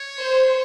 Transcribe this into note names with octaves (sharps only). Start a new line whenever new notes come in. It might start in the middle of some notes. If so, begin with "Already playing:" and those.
Already playing: C#5
C5